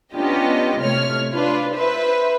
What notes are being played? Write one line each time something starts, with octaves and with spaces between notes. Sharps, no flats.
B3 C#4 D4 F4 G4 D#5
A2 C3 A3 C#5 F6
D4 F4 B4
B4 C5 E5